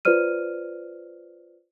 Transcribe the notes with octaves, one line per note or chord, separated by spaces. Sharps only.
F4 B4 C5 D5 F6 D#7